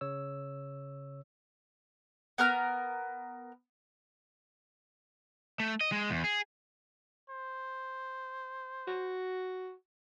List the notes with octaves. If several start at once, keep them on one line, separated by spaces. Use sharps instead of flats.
C#3 C#5 E6
B3 A#4 F6
A3
D#5
G#3
E2
G#4
C5
F#4